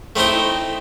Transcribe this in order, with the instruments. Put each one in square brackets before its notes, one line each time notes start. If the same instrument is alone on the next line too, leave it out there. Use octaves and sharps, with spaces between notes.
[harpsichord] A3 C4 D#4 E4 C5